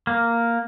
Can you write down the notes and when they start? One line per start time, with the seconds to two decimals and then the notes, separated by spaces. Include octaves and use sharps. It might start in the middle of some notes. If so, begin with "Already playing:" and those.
0.07 A#3